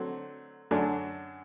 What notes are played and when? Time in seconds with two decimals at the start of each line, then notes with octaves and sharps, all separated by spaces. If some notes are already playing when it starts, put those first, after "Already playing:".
Already playing: D3 F#3 A3 C4
0.71 F#2 D3 F#3 A3 D4